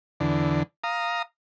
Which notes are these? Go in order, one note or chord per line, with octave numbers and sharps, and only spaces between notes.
E2 D3
F5 A#5 D#6